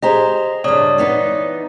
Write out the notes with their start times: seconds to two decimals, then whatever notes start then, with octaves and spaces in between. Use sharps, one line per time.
0.02 G4 G#4 C5 D#5 A#5
0.64 G2 C#3 C#5 D5 D#6
0.98 E3 B3 D#4